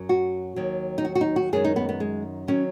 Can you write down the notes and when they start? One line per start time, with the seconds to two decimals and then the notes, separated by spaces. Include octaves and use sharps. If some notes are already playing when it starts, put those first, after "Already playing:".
Already playing: F#2 F#3
0.09 F#4
0.56 D#2 D#3 F#3
0.98 D#4
1.05 F#4
1.15 F#4
1.21 D#4
1.36 F#4
1.53 F#2 D#3 G#3 G#4
1.65 D#4
1.76 B3
1.89 B3
2.00 G#3
2.48 D#3 F#3 C#4